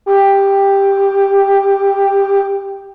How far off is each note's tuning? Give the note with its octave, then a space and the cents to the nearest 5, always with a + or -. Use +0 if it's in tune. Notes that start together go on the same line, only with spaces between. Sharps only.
G4 +10